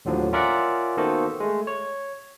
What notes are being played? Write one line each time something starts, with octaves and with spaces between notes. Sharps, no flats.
D#2 A2 D3 F3 F#3
C#4 F4 A#4 D5 E5 F#5
D#3 A#3 B3 F#4 A4 C5
G#3 A3
C#5